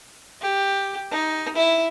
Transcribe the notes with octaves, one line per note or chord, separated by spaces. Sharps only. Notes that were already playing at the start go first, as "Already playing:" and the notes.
G4
D#4
E4